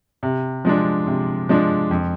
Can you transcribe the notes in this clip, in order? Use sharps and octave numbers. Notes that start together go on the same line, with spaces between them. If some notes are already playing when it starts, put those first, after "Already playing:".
C3
F3 G#3 D4
C3
F3 G#3 D4
F2